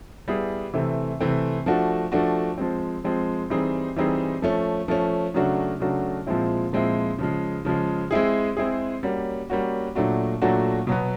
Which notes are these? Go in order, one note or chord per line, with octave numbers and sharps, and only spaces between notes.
G3 B3 E4 G#4
C3 E3 A3 C4
C3 E3 A3 C4
F3 A3 D4 F#4
F3 A3 D4 F#4
F3 G#3 C4
F3 G#3 C4
E3 G3 C4 D#4 G#4
E3 G3 C4 D#4 G#4
F3 A3 C#4
F3 A3 C#4
C#3 F#3 A3 D4 F#4
C#3 F#3 A3 D4 F#4
A#2 F3 G#3 C4 E4
A#2 F3 G#3 C4 E4
C#3 F3 G#3
C#3 F3 G#3
G#3 C4 E4 G#4
G#3 C4 E4 G#4
G3 A#3 C#4 F#4
G3 A#3 C#4 F#4
A#2 F#3 A3 D4 F#4
A#2 F#3 A3 D4 F#4
B2 F#3 B3